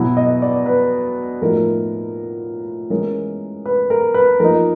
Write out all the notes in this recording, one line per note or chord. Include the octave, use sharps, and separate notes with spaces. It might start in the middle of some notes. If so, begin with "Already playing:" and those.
Already playing: B2 F#3 B3 E4
D#5
D5
B4
A2 F3 A#3 D#4 A#4
E3 G#3 C#4 A#4
B4
A#4
B4
F3 A#3 D#4 A#4